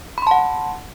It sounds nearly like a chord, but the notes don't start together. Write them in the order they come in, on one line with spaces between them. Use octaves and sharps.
B5 C6 A5 F#5